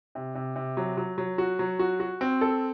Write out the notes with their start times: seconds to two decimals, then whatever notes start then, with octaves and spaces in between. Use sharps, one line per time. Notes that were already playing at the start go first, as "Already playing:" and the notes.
0.15 C3
0.35 C3
0.56 C3
0.77 F#3
0.97 F#3
1.18 F#3
1.38 F#4
1.59 F#3
1.79 F#4
2.00 F#4
2.21 C4
2.41 A4